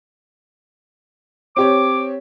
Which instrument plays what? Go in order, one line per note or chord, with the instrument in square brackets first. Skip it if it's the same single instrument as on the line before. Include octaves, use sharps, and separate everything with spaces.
[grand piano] C4 G4 C#5 [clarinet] D6